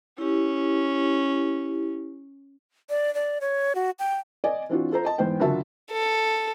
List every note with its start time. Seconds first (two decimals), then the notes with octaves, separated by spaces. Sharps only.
0.18 C#4 E4 G4
2.90 D5
3.14 D5
3.41 C#5
3.75 F#4
3.99 G5
4.44 D5 D#5 G#5
4.69 E3 C4 D4 F4 F#4
4.91 F4 A4 C5 A#5
5.05 D#5 A5
5.18 E2 G#2 B3 C5 G5
5.40 F#1 D3 F4 F#4 E5 A5
5.91 A4